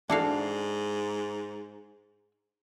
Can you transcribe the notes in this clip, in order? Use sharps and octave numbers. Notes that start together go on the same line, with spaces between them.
G#2 D4 E4 F#4 A4 F5